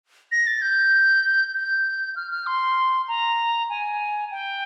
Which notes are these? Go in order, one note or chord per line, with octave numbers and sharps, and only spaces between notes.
A#6
A6
G6
G6
F6
F6
C6
A#5
G#5
G5